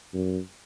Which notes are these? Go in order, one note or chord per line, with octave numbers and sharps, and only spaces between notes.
F#2